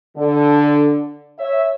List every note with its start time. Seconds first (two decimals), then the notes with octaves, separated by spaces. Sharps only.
0.16 D3
1.39 C#5 E5